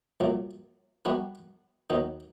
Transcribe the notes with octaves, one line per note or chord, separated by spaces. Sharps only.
C2 A#2 F#3
G3 B3 D4 F#4 A#4
D#2 D#3 F#3 B3 D#4